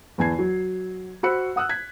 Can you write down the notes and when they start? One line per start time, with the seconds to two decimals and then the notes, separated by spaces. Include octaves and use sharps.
0.18 E2 E3 G#5 A5 G#6 C7
0.39 F#3
1.23 F#4 C5 B5 E6 F#6 C#7
1.56 F#5 D#6 E6 F#6
1.69 G#6 B6